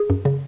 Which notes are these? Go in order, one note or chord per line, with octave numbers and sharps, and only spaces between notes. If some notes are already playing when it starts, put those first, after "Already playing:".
Already playing: G#4
F#2
C#3